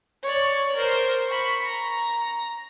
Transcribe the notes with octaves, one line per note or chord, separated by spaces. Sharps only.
C#5 D5
A#4 C5
B5 C#6
A#5